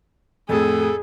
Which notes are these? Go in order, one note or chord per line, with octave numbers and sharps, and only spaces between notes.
F2 A2 G#4 A4